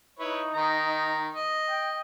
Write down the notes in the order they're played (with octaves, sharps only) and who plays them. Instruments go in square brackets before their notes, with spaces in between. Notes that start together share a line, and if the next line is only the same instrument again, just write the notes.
[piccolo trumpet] D#4 [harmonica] E4 B4 C#5
[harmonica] D#3 A#5
D#5
[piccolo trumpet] G5